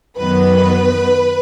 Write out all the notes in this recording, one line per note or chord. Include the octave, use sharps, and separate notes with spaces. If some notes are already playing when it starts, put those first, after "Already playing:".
F#2 D#3 F#3 B3 B4